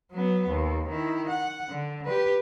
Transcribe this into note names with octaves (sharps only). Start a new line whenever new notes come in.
F#3 B3
D#2
D#3 E4
F#5
D3
G4 B4